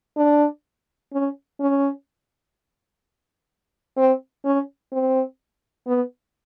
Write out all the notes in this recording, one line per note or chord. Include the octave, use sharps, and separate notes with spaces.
D4
C#4
C#4
C4
C#4
C4
B3